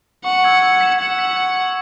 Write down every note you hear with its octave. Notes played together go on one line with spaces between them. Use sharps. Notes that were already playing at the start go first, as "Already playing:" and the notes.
F#5 C#6
E6 G#6 C#7 F#7
E6
B6 E7
F#5 G#6
B6 F#7
G#6
C#7
F#7